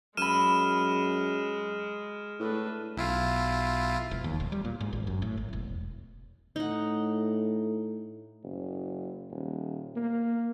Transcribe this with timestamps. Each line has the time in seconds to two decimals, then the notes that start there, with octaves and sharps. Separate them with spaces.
0.17 F#2 G#3 B5 E6 F6 D#7 E7
2.40 A2 D4 B4
2.97 B1 E4 F4
4.11 E1
4.24 D#2
4.40 D#1
4.52 G3
4.65 A#2
4.81 G#2
4.93 G#1
5.07 F#2
5.22 A2
5.37 G#1
5.53 E1
6.56 A2 D#4 F#5
8.43 F#1
9.30 D#1
9.96 A#3